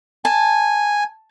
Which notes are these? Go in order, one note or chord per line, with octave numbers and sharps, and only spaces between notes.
G#5 A5